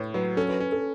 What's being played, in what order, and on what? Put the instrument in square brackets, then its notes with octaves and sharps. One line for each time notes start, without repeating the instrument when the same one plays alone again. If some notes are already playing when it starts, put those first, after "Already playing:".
Already playing: [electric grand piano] A2 [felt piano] B4 C#5
[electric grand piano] F#3 [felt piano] B4
[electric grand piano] C#4 [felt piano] A4
[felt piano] B4
[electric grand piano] C#4 [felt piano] B4
[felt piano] A4